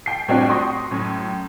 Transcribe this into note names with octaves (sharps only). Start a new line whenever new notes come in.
G5 C7
A2 G3 C4 D4 F#4 G4
C6 C#6 D#6 A#6
F#2 A2